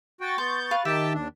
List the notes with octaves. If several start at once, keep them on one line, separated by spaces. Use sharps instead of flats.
F#4 G5 C#6 A6
B3 C6 G6
B4 F5
D#3 G4 E5 G5 A5
D#2 D4